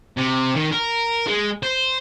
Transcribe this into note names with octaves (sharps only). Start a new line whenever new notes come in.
C3
D#3
A#4
G#3
C5